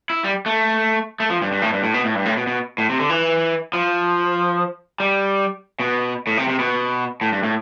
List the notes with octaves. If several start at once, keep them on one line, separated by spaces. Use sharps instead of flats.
E4
G3
A3
A3
F3
G2
G2
A2
G2
A2
B2
A2
G2
A2
B2
B2
A2
C3
D3
E3
F3
G3
B2
A2
C3
C3
B2
A2
G2
A2